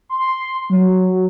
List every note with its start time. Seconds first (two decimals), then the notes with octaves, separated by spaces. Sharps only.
0.09 C6
0.70 F#3